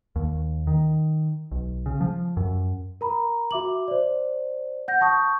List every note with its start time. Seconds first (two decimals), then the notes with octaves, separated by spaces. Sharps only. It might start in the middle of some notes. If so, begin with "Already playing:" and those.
0.16 D#2
0.67 D#3
1.51 B1
1.86 C#3
2.01 F3
2.37 F#2
3.01 A#4 A#5 B5
3.51 F#4 E5 D6 F#7
3.88 C5 D5
4.88 F#5 G6 A#6
5.01 A5 C#6 D#6 G6